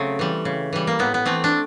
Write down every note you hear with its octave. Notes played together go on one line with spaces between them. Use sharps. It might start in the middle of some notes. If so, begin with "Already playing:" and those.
Already playing: C#3 F#3 A3 C4
E3 G3
C#3
E3 G3
A#3
A2 B3
B3
E3 A3 C4
D4